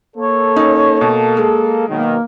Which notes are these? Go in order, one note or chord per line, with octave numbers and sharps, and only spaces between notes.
A#3 A4 C#5
C#4 D#4
B2
G#3 G#4
B2 D#3 F#3 A#3